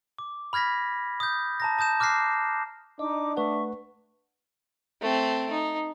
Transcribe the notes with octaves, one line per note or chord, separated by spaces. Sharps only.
D6
B5 F6 G#6 A#6 B6
D#6 G6
A5 A#5 A#6
A5 D#6 G6 E7
D6 F6 F#6 A#6 C7
D4 D#4 D#5 D6
A3 B4 E5 F#5 C#6
A3 C4
D#4